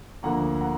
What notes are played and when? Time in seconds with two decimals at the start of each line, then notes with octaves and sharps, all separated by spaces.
0.23 D2 D3 F3 A#3 F#5 A#5
0.61 F#5 A#5